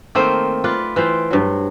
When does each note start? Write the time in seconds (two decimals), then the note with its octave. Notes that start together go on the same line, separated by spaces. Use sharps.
0.15 D#3 A3 A#3 C4
0.64 F4 B4 D5
0.96 E3 F4 C5 G5
1.31 G2 F#3